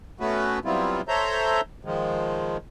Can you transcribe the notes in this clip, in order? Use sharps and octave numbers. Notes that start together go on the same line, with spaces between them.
A3 B3 C#4 F#4 B4
F#3 G3 B3 C4 E4 F4
A4 C5 C#5 E5 A#5 G6
D#3 F3 G#3